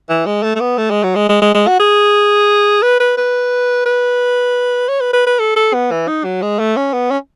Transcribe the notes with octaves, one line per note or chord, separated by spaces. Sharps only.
E3
G#3
A3
A3
B3
A3
G#3
F#3
G#3
G#3
G#3
G#3
F#4
G#4
B4
B4
B4
B4
C#5
B4
B4
B4
A4
A4
B3
E3
D#4
F#3
G#3
A3
C#4
B3
C#4